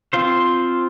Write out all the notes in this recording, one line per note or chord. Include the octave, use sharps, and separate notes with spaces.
C4 F4 C5